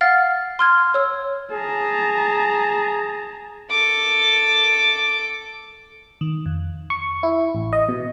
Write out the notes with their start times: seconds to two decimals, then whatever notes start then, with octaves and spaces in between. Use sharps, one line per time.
0.01 F5 F#5 F6 A6
0.59 C6 F6 G#6
0.94 C#5 E6
1.52 G#4 A5 A#5
3.71 A4 D6
6.21 D#3
6.46 F2
6.90 C#6
7.23 E4
7.55 A1
7.73 D#5
7.89 B2